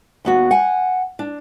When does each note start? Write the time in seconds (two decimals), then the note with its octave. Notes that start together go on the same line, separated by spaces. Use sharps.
0.25 D#2 B3 F#4
0.51 F#5 G#5
1.19 D4